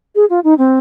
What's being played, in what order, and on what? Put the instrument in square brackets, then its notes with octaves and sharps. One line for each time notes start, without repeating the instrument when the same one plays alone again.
[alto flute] G#4
F4
D#4
C4